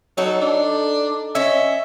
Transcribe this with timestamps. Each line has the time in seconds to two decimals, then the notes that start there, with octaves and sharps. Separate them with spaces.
0.18 F#3 D#4 A4
0.42 D4
1.35 C#4 D#5 E5